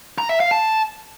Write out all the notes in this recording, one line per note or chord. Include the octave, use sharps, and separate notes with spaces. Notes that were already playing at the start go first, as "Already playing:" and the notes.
A#5
E5
F5
A5